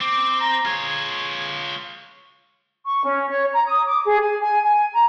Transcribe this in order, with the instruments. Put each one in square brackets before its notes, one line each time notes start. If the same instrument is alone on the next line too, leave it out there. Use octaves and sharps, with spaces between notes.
[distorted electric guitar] C4 [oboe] D6
[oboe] A#5
[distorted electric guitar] F4 C#5 [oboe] G#4
[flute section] C#6
C#4
C#5
A#5
D#6
D6
G#4
G#5
G#5
G#5
A#5